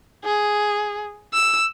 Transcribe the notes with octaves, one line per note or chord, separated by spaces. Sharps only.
G#4
E6